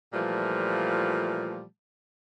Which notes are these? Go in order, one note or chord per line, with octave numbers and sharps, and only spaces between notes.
A#2 E3 F3 G3 A3